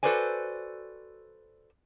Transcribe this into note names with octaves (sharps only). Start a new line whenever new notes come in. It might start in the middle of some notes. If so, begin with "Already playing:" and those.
F#4 A4 B4 C5 D5 G#5